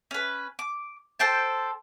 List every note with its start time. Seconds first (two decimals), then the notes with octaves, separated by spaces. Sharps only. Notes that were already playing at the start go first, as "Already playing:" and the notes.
0.11 C#4 B4
0.59 D6
1.19 A4 C5 G5 A5